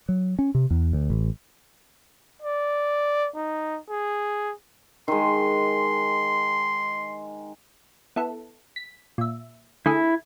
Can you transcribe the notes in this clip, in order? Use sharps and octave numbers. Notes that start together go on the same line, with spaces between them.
F#3
C#4
C3
E2
D2
A1
D5
D#4
G#4
D#3 G#3 C6
B3 E4 A4
B6
A#2 E5
D3 A3 E4 G#4